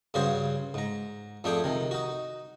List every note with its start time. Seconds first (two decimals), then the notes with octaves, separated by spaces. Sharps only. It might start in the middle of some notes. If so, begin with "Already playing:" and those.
0.14 G2 C#3 F#4 G#4 C5
0.74 G#2 A#5
1.44 F2 A3 D4 G#4 G5
1.64 C3 D#3
1.91 D#4 F#4